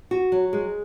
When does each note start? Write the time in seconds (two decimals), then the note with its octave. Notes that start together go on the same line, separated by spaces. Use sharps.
0.11 F#4
0.32 F#3
0.53 G#3